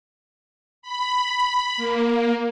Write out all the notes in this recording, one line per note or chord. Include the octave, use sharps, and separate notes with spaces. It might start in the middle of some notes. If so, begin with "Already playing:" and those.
B5
A#3